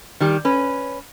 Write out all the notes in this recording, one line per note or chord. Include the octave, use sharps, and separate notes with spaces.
D#3 G3 G4
C#4 B4